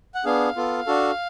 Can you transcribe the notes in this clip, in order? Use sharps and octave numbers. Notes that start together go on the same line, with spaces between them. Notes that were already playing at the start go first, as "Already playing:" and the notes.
F#5
B3 D4 G#4 F5
B3 F4 A4
D4 F#4 A4